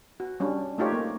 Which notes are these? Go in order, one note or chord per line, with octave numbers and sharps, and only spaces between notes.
F#4
G3 C#4 D4
A3 D#4 F4 G4 C#5
A#3